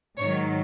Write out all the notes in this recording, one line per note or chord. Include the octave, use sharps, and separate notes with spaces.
G#2 D#3 F#3 C#5